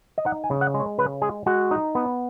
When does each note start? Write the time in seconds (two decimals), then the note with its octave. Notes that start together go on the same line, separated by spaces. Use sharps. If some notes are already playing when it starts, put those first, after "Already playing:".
0.18 D#5
0.25 D#4 F#5
0.44 G#5
0.50 C#3
0.61 F#5
0.74 G#3
0.80 C#5
0.98 C#3 B4
1.22 G#3 G#4
1.46 G#3 F#4
1.71 D#4
1.95 B3